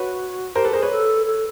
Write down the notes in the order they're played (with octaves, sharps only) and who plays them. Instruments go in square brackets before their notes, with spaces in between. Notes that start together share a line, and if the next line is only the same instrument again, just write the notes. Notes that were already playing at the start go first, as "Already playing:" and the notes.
Already playing: [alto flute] F#4 [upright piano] B4 C#5
[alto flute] G4 [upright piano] A#4 C5
[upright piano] A4 B4
[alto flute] G#4 [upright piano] A#4 C5
[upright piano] B4 C#5
[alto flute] A4
A4